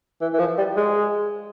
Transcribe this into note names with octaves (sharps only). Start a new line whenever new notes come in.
E3
E3
F3
G3
G#3